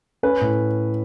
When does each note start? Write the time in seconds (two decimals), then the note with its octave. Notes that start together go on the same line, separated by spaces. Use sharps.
0.23 C#4 B4
0.41 A2